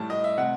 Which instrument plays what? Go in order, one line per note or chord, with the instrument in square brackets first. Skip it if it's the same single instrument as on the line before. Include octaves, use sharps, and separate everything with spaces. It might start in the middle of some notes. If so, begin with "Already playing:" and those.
Already playing: [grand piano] A2 G3 A5
D#5
E5
C3 F#5